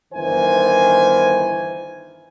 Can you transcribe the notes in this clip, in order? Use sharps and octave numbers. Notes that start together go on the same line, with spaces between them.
G1 D#3 E3 C5 G#5